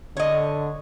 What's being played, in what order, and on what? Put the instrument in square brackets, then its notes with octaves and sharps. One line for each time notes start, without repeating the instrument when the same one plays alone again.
[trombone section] D3 [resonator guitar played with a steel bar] C#5 D#5